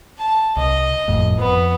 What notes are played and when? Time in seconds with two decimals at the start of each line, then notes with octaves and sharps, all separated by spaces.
0.18 A5
0.57 C2 D#5
1.08 G1 F2 A2
1.39 F2 B3